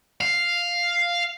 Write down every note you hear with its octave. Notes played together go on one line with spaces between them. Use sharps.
F5